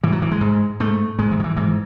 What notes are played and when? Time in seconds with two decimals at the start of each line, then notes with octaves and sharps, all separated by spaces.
0.03 G#2 E3
0.12 F#3
0.22 E3
0.31 G#3
0.41 G#2
0.80 G#2 A3
1.19 G#2 G#3
1.31 E3
1.40 D#3
1.44 E3
1.56 G#2 E3